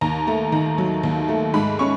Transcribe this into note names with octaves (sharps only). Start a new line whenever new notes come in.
D#2 A#5
A3 A#5
D#3 A#5
F#3
D#2
A3
G#2 B5
C#4 C#6